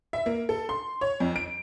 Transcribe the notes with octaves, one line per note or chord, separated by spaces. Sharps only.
E5
A#3
A4
C6
C#5
F2
D7